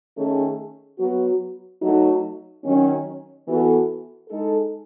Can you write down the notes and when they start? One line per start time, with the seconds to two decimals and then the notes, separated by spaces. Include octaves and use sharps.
0.17 D#3 A3 C#4 G#4
0.99 F#3 B3 F#4
1.81 F#3 A3 D#4 F#4
2.64 D#3 F#3 C#4
3.46 E3 B3 F#4 A4
4.29 G#3 D#4 A4